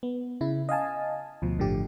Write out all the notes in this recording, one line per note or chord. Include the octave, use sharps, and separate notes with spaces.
B3
C#3 E4
D#5 F5 G#5 A5
D2 B2 F3
G1 A2 D3 F3 G4